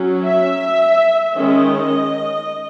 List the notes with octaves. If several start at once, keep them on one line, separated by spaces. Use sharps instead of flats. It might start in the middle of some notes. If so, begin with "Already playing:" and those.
Already playing: F#3 C#4
E5
D#3 G#3 C#4 D#5